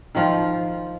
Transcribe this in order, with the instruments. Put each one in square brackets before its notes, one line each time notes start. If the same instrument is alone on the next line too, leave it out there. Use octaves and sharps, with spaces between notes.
[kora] D#3 F3 F4